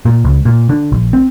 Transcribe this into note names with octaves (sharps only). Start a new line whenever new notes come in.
A#2
C#2
A#2
D3
A#1
C4